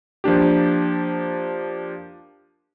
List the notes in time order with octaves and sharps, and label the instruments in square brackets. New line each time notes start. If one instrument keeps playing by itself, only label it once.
[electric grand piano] F3 A#3 D4 G4